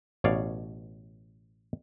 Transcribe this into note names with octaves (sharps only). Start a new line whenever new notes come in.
A1 B2 C#5 D5 F5